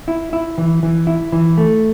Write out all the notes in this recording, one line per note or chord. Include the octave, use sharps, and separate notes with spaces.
E4
E4
E3
E3
E4
E3
A3